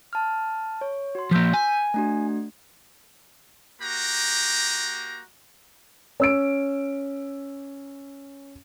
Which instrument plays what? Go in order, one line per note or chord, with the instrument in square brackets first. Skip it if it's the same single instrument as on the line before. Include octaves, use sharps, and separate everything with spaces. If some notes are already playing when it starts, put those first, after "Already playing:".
[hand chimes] A5 F6
C#5
F#4 C6
[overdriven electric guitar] F3 A#3 [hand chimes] E6 G6 B6
[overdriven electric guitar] G#5
[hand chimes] A3 D4 F#4
[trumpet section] A#3 F#4 G4 A#5
[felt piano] C#4 E6 D7